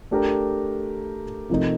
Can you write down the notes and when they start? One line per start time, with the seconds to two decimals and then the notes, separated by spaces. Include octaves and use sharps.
0.11 A3 D4 G4 A#4
1.50 C3 F3 A3 D#4 A#4